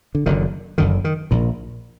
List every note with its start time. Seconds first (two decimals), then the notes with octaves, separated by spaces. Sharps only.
0.15 D3
0.26 F#1 F#2 D3 D#3
0.78 F#1 F#2 D3 D#3
1.05 D#3
1.31 A#1 A#2